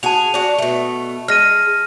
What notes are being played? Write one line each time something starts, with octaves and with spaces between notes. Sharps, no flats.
F#4 G#4 A5 F7
D4 F#4
B2 A3
G#3 F6 A#6 D#7